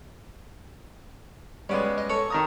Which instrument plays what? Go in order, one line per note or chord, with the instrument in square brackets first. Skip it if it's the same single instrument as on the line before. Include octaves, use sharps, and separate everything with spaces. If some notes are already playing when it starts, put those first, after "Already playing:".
[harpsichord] G3 D6 [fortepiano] G#3 B3 C#4
[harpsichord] D#5
A4 C#5
[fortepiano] D#3 A#5 D#6